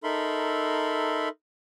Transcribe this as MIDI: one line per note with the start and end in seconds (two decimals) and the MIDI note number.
0.04 1.29 63
0.04 1.29 69
0.04 1.29 70
0.04 1.29 76
0.04 1.29 83
0.04 1.29 84